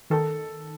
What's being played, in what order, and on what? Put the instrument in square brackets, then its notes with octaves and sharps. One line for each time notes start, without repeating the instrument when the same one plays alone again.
[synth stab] D#3 [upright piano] A4